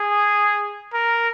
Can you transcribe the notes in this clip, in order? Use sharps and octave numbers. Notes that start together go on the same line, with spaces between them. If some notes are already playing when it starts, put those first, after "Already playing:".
Already playing: G#4
A#4